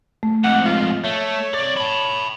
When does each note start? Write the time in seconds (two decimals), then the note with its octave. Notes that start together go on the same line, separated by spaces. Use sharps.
0.23 A3
0.44 F2 G#2 F#5
0.65 F4
1.04 A3 C#5 E5
1.54 C2 D5
1.77 A5 B5